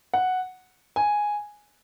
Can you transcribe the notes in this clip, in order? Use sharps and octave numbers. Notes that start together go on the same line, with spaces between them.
F#5
G#5